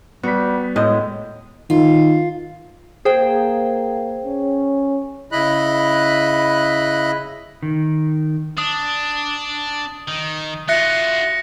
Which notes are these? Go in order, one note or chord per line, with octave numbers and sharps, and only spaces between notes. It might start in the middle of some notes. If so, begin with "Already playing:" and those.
G3 B3 F#4 B6
A2 G#3 D#5
D#3 F4
A#3 G#4 C5 G5
C#4
C#3 E4 D#5 B5 F#6
D#3
D4 D#6
D#3
F4 F#4 E5 F#6 A#6 C#7